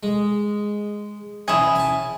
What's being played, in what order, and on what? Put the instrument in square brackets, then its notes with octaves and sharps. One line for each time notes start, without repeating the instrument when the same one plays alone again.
[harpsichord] G#3
[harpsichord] E3 C#4 [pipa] E4 G#4
[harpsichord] G#5 A5